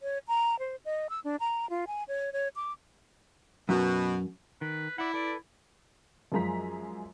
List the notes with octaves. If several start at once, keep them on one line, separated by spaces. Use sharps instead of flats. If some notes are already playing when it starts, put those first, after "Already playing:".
C#5
A#5
C5
D#5
E6
D4
A#5
F4
G#5
C#5
C#5
D6
F#2 B2
D#3 B4
E4 D5 E5 F#5
A4 B4 D5
F#2 F3 G#3 A#5 B6